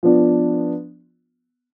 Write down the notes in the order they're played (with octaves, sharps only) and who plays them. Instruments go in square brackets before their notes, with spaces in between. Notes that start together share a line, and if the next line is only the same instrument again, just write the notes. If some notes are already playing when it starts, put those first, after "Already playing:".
[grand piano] F3 B3 D4